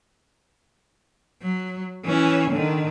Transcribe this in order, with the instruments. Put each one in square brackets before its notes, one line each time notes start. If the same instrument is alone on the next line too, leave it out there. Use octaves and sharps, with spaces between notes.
[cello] F#3
E3 C#4
D3 D#3